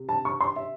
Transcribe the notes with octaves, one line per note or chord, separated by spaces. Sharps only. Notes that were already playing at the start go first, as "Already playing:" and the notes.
Already playing: C3
A5
C#6
C6
E5